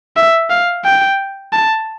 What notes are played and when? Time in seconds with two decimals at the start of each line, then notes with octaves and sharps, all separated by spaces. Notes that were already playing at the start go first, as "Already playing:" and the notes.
0.17 E5
0.50 F5
0.85 G5
1.53 A5